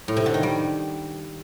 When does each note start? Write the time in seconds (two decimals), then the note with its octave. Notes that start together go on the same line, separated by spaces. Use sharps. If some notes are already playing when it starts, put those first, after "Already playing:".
0.08 A2
0.17 C3
0.26 D3
0.34 D#3
0.43 G3